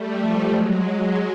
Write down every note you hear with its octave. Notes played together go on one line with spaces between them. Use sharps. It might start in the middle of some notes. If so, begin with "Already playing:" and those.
Already playing: G3 A3
F3 G3
F#3 G#3
F#3 G#3